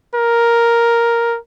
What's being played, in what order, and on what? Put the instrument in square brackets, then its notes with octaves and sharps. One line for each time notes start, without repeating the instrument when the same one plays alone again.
[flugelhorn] A#4